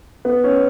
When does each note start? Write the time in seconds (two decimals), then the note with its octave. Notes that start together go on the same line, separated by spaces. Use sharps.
0.25 B3
0.44 C#4